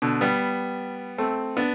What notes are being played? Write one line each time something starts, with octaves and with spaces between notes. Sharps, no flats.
B2 D3
G3 B3
A3 C4
B3 D4